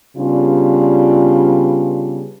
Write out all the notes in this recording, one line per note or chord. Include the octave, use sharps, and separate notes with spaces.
C#3 G3 B3 D4 F4